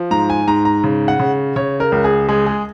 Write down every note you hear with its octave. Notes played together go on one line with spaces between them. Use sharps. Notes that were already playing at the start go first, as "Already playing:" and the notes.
Already playing: F3
G#2 A#5
G#5
G#2 A#5
A#5
C#3
F#5
C#3
C#3 C#5
A#4
C#2
G#4
G#3 G#4
G#4